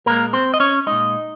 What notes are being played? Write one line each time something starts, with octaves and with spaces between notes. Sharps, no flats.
A#2 G#3 A#3 A#4
C4 C5
D#5
C#4 C#5
A#2 G#3 D#4 D#5